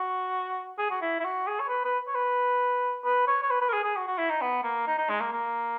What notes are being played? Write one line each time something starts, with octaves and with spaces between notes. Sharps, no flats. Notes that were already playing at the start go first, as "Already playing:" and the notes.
Already playing: F#4
G#4
F#4
E4
E4
F#4
G#4
C#5
B4
B4
C#5
B4
B4
C#5
C#5
B4
B4
A#4
G#4
G#4
F#4
F#4
E4
D#4
B3
A#3
D#4
D#4
G#3
A#3
A#3